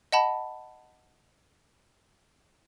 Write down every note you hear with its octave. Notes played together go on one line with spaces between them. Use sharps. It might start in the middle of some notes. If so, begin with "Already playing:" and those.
D#5 F#5 A5 B5